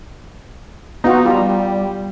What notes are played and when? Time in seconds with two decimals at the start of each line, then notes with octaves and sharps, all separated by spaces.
1.04 B3 D#4 F4 F#4
1.25 G3 F4 A#5